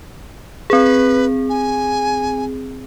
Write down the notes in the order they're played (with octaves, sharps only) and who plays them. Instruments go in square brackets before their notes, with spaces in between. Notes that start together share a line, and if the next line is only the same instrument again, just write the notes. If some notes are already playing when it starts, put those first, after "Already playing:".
[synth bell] C4 G#4 [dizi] B4
[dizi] G#5